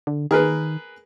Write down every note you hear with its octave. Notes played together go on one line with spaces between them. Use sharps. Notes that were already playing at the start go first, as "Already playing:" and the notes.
D3
D#3 G#4 A#4 B4